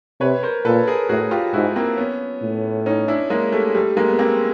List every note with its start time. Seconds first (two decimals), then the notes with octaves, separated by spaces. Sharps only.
0.20 C3 B4 C#5
0.43 A#4 C5
0.65 A#2 A4 B4
0.87 G#4 A#4
1.09 A2 F#4 G#4
1.31 F4 G4
1.53 G#2 E4 F#4
1.76 A#3 C4
1.97 B3 C#4
2.42 A2
2.86 C#4 D#4
3.08 D4 E4
3.30 G#3 A#3
3.52 G3 A3
3.75 G3 A3
3.97 G#3 A#3
4.08 B3
4.19 A#3 C4